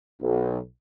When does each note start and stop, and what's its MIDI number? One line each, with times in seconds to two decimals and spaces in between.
0.22 0.59 35